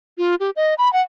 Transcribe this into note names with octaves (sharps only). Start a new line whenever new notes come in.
F4
G4
D#5
B5
F#5